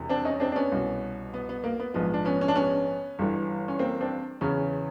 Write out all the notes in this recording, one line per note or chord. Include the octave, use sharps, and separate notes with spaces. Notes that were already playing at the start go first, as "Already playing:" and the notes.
Already playing: E1 E2 C3
C4 D4
C#4 D#4
C4 D4
D4
B3 C#4
C2 B2
B3
B3
A#3
B3
A#1 G#2 F3 B3
D4
B3 C#4
C#4
D4
B3 C#4
G1 G2 E3
C#4
A#3 C4
C4 D4
E2 C#3 E3 B3 C#4